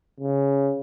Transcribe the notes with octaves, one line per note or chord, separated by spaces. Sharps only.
C#3